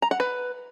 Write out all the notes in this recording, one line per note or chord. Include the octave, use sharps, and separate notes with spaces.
A#5
F#5
B4